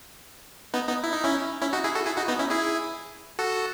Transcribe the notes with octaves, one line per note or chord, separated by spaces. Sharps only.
B3 D#4
B3 D#4
E4
D#4
C#4 E4
C#4 E4
D#4 F#4
E4 G#4
F#4 A4
E4 G#4
D#4 F#4
B3 D#4
C#4 E4
E4 G#4
F#4 A4